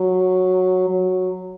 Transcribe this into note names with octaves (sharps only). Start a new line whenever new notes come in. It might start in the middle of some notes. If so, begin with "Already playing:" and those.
Already playing: F#3
F#3